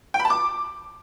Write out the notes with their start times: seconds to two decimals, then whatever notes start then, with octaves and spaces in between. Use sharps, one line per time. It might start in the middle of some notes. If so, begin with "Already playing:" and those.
0.14 G5
0.20 B5
0.25 A5
0.30 D6